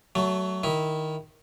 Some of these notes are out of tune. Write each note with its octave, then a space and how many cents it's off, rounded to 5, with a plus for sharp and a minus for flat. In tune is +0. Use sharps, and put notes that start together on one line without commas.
F#3 +20 A3 +0
D#3 +0 E4 -10